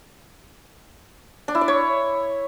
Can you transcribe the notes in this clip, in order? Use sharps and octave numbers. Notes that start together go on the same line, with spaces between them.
D4
E4
D5
C#5